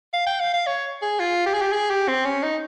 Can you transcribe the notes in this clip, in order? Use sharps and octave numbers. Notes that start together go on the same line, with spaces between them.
F5
G5
F5
F5
C#5
G#4
F4
G4
G#4
G4
G#4
G4
C4
C#4
D#4